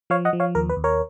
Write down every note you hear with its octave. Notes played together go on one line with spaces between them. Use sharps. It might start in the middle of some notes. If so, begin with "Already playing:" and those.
F3 C#5 F5
D#5 F#5
F3
C#5 F5
D#2 A#4
B4
D#2
A#4 C#5